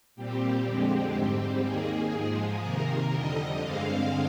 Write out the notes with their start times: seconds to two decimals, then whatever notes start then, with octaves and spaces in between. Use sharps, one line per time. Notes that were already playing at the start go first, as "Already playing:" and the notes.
0.16 A#2 G3 C4 G4
0.65 F2 D3 G#3 C4
1.14 G#2 G3 C4
1.64 D#2 D#3 A#3 G#4
2.13 G#2 F3 G#3
2.62 C3 D#3 A#3 A#4
3.12 F2 D3 G3 D#5
3.61 G2 D3 G#3 C4 F5